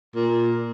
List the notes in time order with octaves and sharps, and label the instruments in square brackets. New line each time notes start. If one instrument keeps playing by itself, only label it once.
[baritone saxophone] A#2